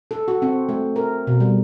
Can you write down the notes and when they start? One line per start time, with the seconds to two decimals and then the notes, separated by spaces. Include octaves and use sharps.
0.11 A4
0.28 F#4
0.42 C4
0.69 A3
0.96 A#4
1.27 B2
1.40 G3